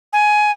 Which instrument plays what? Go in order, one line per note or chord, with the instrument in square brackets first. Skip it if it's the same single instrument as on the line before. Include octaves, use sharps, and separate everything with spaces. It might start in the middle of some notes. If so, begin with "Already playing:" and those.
[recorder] G#5